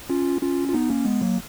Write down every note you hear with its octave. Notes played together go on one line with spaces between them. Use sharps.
C#4 F4
C#4 F4
F4
B3 D#4
A#3 C#4
G#3 B3
F#3 A#3